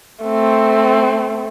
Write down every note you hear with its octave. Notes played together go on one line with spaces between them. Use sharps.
A3 C4